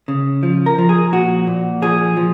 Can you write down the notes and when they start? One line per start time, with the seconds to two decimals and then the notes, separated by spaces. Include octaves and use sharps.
0.08 C#3
0.43 F3
0.66 A#4
0.78 F3
0.89 G#4
1.12 A#2 F#4
1.47 A#2
1.82 F3 G#4
2.17 F3